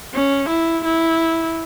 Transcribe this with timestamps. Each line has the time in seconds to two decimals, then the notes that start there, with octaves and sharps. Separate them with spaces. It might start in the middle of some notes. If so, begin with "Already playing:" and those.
0.14 C#4
0.50 E4
0.85 E4